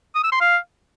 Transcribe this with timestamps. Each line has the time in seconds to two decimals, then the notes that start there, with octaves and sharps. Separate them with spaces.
0.15 D#6
0.24 E6
0.32 C6
0.41 F5